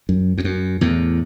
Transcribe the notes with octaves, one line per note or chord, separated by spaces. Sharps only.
F#2
E2
F#2
E2 A2